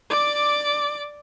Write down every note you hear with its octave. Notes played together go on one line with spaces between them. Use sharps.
D5 D6